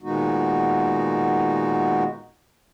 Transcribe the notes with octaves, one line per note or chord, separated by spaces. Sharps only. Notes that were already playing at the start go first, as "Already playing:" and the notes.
A#2 D#3 G#3 B3 D#4 F#4